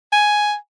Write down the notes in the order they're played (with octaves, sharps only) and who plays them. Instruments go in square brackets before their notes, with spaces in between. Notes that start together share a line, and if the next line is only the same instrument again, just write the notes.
[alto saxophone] G#5